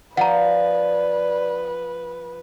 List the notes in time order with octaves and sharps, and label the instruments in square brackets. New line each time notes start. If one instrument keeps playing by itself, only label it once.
[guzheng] F3 [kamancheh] B4 [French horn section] D5 [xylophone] F#5 A#5